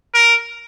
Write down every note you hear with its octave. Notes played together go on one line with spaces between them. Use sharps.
A#4